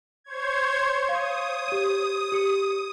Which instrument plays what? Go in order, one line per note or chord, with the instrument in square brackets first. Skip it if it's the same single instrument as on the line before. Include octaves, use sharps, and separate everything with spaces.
[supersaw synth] C5 C#5 G#6
[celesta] F5 [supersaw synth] D#6
[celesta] G4 D#7
G4 C#7